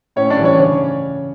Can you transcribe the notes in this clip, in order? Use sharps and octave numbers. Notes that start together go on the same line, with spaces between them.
A2 C#4 C#5
D4 D5
E3 G3
C#4 C#5
C#3 C#4 C#5